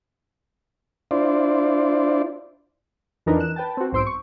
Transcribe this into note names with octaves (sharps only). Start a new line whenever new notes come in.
D4 E4 F4 C5 D5
F2 E3 D4 D#4 A#4 B4
F#6 E7
B4 G5 A5
C4 F#4
B1 G#2 C5 C6 E6 D7
C#6